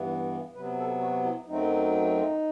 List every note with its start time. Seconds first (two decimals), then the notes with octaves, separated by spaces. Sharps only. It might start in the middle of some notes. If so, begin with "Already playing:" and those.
Already playing: G2 E3 B3
0.54 C3 F#3 B3 B4
0.78 A4
1.00 F#4
1.24 E4
1.47 F#2 F#3 A3 C4 D#4